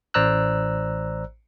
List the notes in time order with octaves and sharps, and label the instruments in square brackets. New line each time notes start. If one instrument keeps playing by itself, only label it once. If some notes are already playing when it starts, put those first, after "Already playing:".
[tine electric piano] A1 C5 D5 A#5 E6 F#6